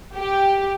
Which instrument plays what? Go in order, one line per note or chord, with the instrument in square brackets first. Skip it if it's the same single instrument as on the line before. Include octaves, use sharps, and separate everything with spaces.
[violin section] G4